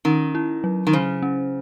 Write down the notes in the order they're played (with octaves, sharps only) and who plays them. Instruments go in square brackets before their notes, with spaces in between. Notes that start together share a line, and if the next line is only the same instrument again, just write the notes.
[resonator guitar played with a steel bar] D#3 [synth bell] C#4
[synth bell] E4
F#3
[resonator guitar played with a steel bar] D#3
[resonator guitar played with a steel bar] C#3 [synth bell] C5
[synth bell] C#4